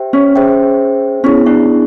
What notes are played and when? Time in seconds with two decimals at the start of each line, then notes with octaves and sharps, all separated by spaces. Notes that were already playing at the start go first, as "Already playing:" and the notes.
Already playing: G4 C5 E5 G5
0.13 C#4
0.36 G#4 C5 E5 G5
1.24 B3 C#4 E4 G#4
1.46 D4